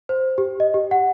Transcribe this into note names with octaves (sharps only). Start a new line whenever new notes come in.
C5
G4
D#5
G4
F#5